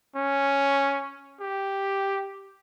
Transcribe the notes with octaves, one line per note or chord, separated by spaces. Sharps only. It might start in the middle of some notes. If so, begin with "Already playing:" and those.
C#4
G4